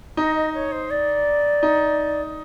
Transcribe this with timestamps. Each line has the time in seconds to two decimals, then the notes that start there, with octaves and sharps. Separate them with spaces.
0.17 D#4 D#5
0.36 D#5
0.54 C#5
0.72 C5
0.90 D5
1.63 D#4